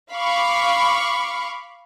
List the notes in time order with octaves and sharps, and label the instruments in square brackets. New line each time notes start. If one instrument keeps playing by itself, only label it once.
[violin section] F5 B5 C#6 D6